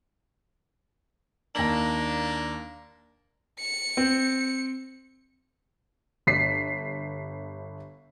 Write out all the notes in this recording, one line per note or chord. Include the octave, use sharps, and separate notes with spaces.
D#2 A#3 D4 A#6 F#7
C#7
C4
G1 B6 C7